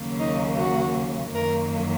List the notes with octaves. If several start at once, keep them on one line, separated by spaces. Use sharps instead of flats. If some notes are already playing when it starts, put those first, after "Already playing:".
Already playing: D#2 C#3 F#3 A#3
D#4
F#4
F#2 D#3 F#3 A#3 A#4